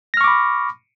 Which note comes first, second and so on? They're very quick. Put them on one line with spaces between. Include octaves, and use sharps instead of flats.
A#6 F6 C#6 D6 B5